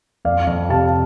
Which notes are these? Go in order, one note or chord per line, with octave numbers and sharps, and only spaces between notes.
F2 D5 F5
F2
C3 F5 A5